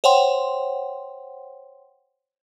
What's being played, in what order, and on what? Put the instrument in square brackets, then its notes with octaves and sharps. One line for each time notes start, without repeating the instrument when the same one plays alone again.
[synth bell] C5 C#5 F#5 G5 C6